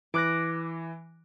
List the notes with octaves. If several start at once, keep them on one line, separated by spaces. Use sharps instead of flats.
E3 D6 F#6 A#6